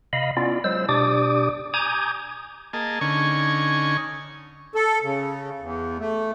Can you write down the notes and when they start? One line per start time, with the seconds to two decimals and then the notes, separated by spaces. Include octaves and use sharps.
0.13 C3 D#5 F5 B5
0.37 B3 C#4 E4 F4 D5
0.64 F#3 G#3 C5 E6
0.89 B2 D4 G4 D5 D6 D#6
1.74 G#5 A#5 D6 D#6 G6 G#6
2.73 A#3 G#4 D#5 A5
3.01 D3 C#4 D#4 G#5 C#6
4.75 A4
5.03 C#3
5.60 E2
5.99 A3